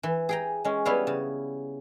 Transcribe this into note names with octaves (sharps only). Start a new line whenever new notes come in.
E3
G#4 G5 A#5
G#3 C#4
G3 B3 E4 B4 C#5 F5
C#3